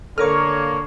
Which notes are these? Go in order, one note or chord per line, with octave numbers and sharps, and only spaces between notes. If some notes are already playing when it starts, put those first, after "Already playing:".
D3 A#3 A4 A#4 C#5 D#6 F6